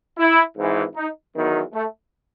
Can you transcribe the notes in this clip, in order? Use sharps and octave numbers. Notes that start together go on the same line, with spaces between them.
E4
G#1 G#2 E3
D#4
E2 D#3 F#3 B3
A3